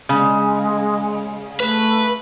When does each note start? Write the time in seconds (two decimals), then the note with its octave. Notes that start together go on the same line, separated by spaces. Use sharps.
0.09 C#3 G#3
1.60 A3 B4